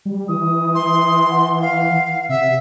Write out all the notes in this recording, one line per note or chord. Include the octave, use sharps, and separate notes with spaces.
G3
E3 D#6
C6
F#5
F5
C3 E5